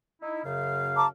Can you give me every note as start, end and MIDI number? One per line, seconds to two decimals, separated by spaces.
0.22 0.40 63
0.22 0.40 64
0.45 1.06 42
0.45 1.06 49
0.45 1.06 77
0.96 1.06 81
0.96 1.06 82
0.96 1.06 86